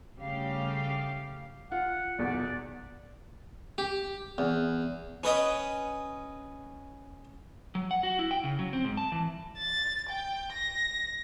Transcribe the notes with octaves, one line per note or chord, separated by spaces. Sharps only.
C#3 G3 A3 G4 F5
F4 F#5
D#1 B1 E2 D5 F#5
G4
E2
C#4 B4 D#5 G5
F#3
F#5
F#4
E4
G5
C#3
F#3
C4
G#2
A5
E3
A6
G5
A#6